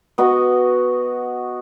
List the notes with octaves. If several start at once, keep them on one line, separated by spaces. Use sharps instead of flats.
B3 F#4 D#5